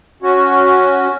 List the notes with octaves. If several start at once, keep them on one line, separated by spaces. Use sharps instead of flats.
C#4 F#4